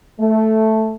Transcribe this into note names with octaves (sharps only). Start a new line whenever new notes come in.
A3